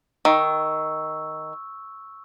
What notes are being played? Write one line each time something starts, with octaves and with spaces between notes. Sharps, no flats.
D#3 C#6 E6